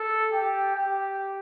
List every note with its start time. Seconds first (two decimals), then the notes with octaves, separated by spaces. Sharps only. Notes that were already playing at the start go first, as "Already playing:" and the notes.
Already playing: A4
0.32 G4
0.76 G4